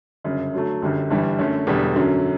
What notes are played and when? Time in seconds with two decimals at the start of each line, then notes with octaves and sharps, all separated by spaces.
0.24 G1 F#2 C#3
0.54 D3 F#3 A3
0.82 G1 F#2 D3 G3
1.10 G1 G2 E3 G3
1.39 F#2 D3 A3 C#4
1.67 E1 E2 D3 G3 B3
1.95 F#2 D3 F#3 C#4